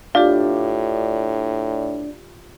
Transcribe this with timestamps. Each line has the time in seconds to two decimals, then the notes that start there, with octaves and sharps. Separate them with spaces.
0.15 A2 D4 F4 G4 D5 F5